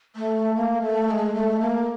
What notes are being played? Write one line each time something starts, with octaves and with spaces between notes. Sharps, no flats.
A3
A#3
A3
A3
G#3
A3
A#3